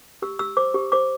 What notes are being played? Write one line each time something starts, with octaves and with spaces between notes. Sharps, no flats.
G4 E6
G4 E6
C5 D6
G4
C5 D6